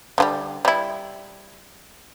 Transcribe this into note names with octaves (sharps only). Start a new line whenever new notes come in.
D3 F3 G3
G3 E4